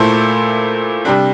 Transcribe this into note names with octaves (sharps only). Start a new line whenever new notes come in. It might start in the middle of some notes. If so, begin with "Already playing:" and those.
Already playing: A#2 A3 E4 A4 C5
C3 G3 D4